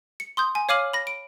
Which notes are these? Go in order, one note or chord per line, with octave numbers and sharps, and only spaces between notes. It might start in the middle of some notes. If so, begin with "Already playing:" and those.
C#7
C6 D#6 G6
G#5
C#5 F5 D6 F6 D#7 F#7
B5 A#6
D7